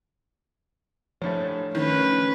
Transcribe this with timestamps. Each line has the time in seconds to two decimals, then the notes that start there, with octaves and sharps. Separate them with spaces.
1.22 F1 A2 F3 A3 D4 C#5
1.75 D#3 C#4 B4